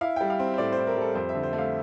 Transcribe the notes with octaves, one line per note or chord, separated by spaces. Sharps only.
E4 F5
G3 G5
F5
C4
C5
A2 D5
E4 C5
A#4
G3 A4
F2 C5
E5
D3
C5
A3
F5